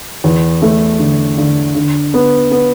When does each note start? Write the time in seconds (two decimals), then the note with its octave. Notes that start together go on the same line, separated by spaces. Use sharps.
0.24 E2
0.62 A3
0.99 D3
1.38 D3
1.75 D3
2.14 B3
2.51 B3